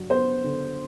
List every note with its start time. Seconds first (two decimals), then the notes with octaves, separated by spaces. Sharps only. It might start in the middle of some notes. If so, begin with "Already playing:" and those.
Already playing: G2 F#3
0.10 B3 C5
0.44 D3